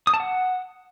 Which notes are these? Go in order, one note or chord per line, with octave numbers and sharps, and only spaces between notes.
D#6
A5
F#5